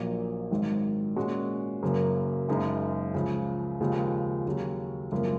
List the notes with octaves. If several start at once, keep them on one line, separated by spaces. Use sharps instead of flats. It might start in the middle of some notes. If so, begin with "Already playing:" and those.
Already playing: A#1 A#2 F#3 A#3
G#1 G#2 D#3 F#3
A#2 G#3 C#4 F#4
F#1 F#2 C#3 F#3 A#3
F#1 F#2 C#3 G#3 D#4
C#2 C#3 F3
D#2 C#3 F3 G#3
D#2 C#3 F#3
G#1 F#2 C#3 F3 A#3